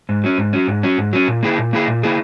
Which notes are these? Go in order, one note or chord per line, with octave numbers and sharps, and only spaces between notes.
G#2
F#3 C#4
G#2
F#3 C#4
G#2
F#3 C#4
G#2
F#3 C#4
A#2
A#3 E4 G#4
A#2
A#3 E4 G#4
A#2
A#3 E4 G#4